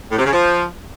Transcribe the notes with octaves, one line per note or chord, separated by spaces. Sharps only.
A2
C3
C#3
F3